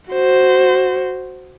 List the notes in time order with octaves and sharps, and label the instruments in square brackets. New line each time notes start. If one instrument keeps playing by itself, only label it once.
[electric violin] F#4 C5